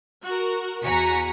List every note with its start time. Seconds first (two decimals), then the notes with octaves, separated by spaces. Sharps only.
0.25 F#4 A#4
0.83 E2 F#4 G#5 A#5 B6 C#7